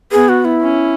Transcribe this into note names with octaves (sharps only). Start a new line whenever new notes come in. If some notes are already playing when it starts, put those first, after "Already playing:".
B3 G#4
F#4
E4
C#4